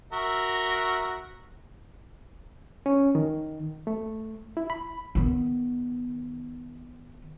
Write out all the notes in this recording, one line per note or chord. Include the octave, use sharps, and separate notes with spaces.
F#4 A#4 E5
C#4
D#3
A3
E4
B5
D#3 B3